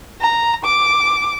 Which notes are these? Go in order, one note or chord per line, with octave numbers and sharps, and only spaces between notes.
A#5
D6